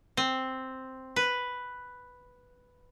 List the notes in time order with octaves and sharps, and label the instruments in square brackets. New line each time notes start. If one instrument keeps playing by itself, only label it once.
[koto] C4
B4